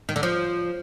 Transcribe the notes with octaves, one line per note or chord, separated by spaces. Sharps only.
D#3
D3
F3